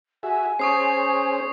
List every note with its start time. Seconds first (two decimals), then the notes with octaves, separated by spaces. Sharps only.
0.23 F#4 G#4 E5 G#5
0.59 C#4 G#4 C5 C#6 D#6 C7